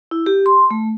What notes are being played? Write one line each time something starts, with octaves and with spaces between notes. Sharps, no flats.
E4
G4
C6
A3